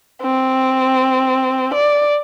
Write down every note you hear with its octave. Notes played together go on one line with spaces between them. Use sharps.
C4
D5